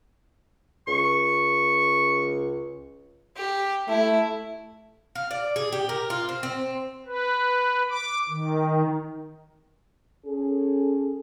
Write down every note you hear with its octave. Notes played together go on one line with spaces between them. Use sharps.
C#2 C#6
G4
A3 E4
F5
D5
G#4
G4
A#4
F4
C4
C4
B4
D6
D#3
C#4 G#4 A4